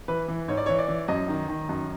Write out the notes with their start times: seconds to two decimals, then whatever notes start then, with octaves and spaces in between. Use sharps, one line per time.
0.08 E3 B4
0.28 E3
0.48 G#2 C#5
0.57 D5
0.66 E3 C#5
0.78 D5
0.88 E3
1.08 F#2 D#5
1.28 D#3
1.48 D#3
1.69 F#2